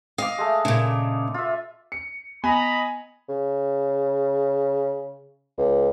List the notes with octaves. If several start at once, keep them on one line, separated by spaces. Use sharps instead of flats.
D#5 F5 D6
G#3 A3
A#2 C#3
F4 E5
C#7
B3 D#5 G#5 A#5 B5
C#3
C#2